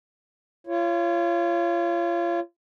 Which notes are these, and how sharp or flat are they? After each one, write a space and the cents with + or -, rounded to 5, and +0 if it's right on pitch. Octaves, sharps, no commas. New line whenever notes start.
F4 -30 C#5 +0